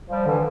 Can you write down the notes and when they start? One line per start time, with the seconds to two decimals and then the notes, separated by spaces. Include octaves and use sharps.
0.10 F3 G3
0.26 D3 E3